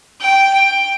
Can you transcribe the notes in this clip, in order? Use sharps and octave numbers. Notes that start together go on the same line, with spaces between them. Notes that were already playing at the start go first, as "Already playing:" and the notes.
G5
G5